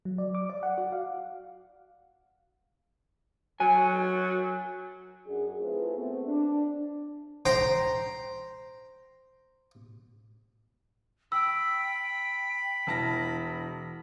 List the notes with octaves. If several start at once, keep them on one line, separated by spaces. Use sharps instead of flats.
F#3
D5
D6
D5
F#5
F#4
F5
F#3 G#5
F#2 F#3 D4 G#4
A3 C4 E4 F4 G#4 B4
A3 B3 C4
D4
C5 G5 A#5 C6
G5 B5 E6
E1 E4 A5 A#6